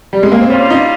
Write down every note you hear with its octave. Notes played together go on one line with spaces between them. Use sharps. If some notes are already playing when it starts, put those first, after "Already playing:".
G3
G#3
A#3
C4
G3 A#3 C#4 F4
D#4